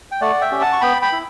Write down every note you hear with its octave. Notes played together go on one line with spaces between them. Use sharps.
G5
A3 D5 F#5
E5 G5
C#4 G4
F#5 A5
C#6
B3 G5 B5
G5 B5
E4